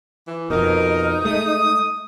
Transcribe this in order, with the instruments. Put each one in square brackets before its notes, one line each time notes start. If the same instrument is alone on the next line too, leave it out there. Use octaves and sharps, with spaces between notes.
[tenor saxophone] E3
[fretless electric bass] F2 B2 [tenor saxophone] D#4 [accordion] A#4
[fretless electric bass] G#3 A3 [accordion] D#6